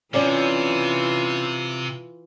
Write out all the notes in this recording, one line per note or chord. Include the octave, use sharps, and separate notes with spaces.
C3 E3 C#4 F4 D5